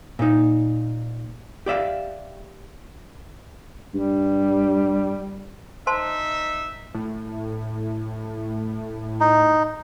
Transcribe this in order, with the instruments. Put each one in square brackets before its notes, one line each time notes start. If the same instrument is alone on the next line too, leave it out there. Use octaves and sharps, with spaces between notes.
[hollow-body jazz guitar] A#2 D#4
G4 D5 E5 F5
[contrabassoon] G2 [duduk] G3
[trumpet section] D#4 E5 [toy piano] C5 A5 C6
[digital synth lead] A2
[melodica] D#4